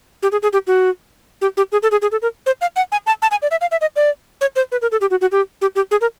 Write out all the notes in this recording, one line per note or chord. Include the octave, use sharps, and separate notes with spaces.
G4
G#4
G#4
G4
F#4
G4
G4
G#4
A4
G#4
G#4
A4
A#4
C5
F5
F#5
G#5
A5
A5
G#5
D5
E5
F5
E5
D#5
D5
C#5
C5
B4
A#4
A4
G4
F#4
F#4
G4
G4
G4
G#4
A#4